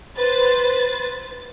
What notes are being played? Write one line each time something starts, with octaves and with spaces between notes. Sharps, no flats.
B4 C5 A6